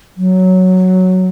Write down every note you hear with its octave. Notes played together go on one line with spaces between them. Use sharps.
F#3